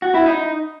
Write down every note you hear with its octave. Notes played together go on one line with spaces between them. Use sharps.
F#4
E4
D#4